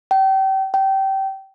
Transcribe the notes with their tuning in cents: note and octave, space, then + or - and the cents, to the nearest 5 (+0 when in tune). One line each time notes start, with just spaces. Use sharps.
G5 -30
G5 -20